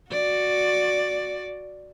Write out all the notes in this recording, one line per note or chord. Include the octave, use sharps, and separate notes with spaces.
F#4 D5